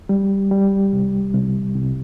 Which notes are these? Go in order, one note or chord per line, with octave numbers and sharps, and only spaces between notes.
G3
G3
C2
C2
C2